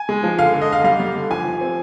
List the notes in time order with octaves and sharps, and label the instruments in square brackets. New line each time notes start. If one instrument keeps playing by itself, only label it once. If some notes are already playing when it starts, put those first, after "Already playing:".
Already playing: [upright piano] G#5
G#3
F3
D3 F5
D3
D#5
D3 F5
G3 F5
G3
D3
F3 G#5
F3
C4